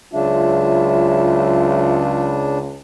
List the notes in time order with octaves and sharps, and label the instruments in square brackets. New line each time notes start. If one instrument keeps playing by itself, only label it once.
[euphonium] C#2 [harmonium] C#3 D4 [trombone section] F#3 F4 [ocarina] E5